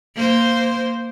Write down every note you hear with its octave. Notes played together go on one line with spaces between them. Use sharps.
A#3 C5